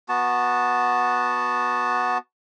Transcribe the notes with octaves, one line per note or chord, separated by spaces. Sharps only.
B3 F#4 A5